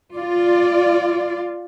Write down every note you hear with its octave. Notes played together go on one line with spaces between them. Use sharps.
F4 D5